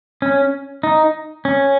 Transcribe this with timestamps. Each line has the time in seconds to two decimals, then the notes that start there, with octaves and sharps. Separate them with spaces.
0.22 C#4
0.83 D#4
1.45 C#4